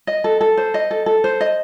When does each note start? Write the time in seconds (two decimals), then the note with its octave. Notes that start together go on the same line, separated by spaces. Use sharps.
0.07 D#5
0.24 A4
0.41 A4
0.57 C5
0.74 D#5
0.91 A4
1.06 A4
1.24 C5
1.41 D#5